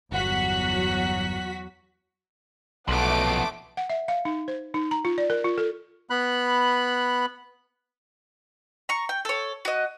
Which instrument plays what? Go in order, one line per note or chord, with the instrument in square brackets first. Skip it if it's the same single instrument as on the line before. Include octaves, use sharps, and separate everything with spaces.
[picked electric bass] G1 [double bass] E2 F#3 [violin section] F#4 B6 [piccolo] F#5
[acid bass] B1 [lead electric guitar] F3 B3 [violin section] A3 D6 [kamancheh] F#5 A5
[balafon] F#5
E5
F5
D#4
C5
D#4
A#5
F4
D5
A#4
F4
A4
[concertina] B3 B5 F#6
[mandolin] A#5 C#6
G5
A4 C#5
F#4 D#5